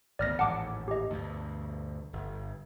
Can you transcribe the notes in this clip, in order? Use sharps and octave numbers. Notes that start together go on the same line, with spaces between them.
G#1 D2 B3 D5 F6 A#6
A1 D#2 G#2 F#5 A5 D6
G4 D#5
D2 G2 B2
G1